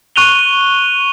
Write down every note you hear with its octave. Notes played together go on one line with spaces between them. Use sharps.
C#6 F#6 D#7 F7 G7